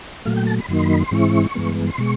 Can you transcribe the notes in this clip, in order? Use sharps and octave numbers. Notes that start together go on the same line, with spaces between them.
A#2 F#3 A3 F5
G5
A5
B5
F#2 D#3 F#3 A#3 D#4 C6
B5
C6
G#2 E3 G#3 C4 E4 C#6
G2 E3 G#3 B3
C6
B2 G#3 C#6